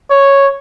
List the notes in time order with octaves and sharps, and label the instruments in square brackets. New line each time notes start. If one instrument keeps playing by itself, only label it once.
[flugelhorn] C#5